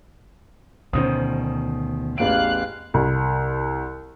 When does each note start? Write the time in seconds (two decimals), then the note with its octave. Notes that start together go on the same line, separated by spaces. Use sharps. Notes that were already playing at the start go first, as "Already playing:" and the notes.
0.93 D2 B2 D#3 C#4 C5 D#6
2.18 A1 E2 F5 F#6 D7
2.94 C2